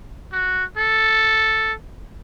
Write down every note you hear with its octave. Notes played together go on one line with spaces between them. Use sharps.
F#4
A4